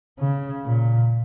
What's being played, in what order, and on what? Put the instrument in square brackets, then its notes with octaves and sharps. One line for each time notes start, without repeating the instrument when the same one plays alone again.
[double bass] C#3
A#2